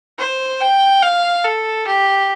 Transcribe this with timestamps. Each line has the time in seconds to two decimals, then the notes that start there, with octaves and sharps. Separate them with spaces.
0.19 C5
0.61 G5
1.02 F5
1.44 A4
1.87 G4